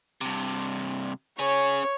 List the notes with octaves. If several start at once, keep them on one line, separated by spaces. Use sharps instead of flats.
G2 C3
C#4 G#4 C#5